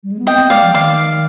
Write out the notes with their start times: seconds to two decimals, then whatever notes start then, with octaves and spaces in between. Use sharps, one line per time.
0.03 G3
0.11 G#3
0.19 B3
0.27 C4 D#5 G5
0.38 B3
0.50 G#3 D5 F5
0.62 F3
0.74 D#3 D5 F5